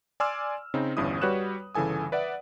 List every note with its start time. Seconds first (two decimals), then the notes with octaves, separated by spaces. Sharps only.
0.20 D5 G#5 C6 D6 E6 F6
0.74 C#3 C4 D#4
0.97 G1 E2 G2 C#4 E4 D#6
1.21 G3 F#4 B4 C#5 F#6 E7
1.75 G1 C#3 E3 A4 G#5 D#6
2.12 B4 D5 E5 F#5